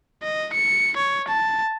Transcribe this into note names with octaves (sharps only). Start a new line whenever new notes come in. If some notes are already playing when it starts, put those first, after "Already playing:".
D#5
C#7
C#5
A5